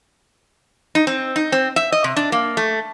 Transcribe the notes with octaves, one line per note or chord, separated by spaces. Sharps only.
D#4
C4
D#4
C4
E5
D#5
C3
D4
A#3
A3